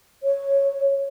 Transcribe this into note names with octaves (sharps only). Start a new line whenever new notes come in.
C#5